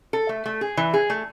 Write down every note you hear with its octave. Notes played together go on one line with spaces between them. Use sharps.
A4
A3
A3
G#4
E3
G#4
A3